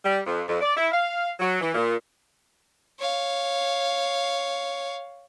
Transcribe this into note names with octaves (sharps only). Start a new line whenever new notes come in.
G3
F2
F2
D5
E4
F5
F#3
E3
A#2
C#5 F5